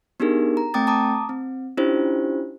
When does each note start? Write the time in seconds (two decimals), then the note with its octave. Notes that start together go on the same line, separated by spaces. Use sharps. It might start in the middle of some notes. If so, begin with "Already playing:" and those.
0.20 B3 D4 D#4 G4 G#4 A#4
0.57 A#5
0.74 A3 C4 G5 D6 D#6 A6
0.87 A5 A#5 D6 D#6
1.29 C4
1.77 C#4 D4 E4 F4 G4 C5